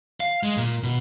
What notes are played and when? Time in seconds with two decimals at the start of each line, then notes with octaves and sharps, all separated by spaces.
0.20 F5
0.43 G#3
0.57 A#2
0.83 B2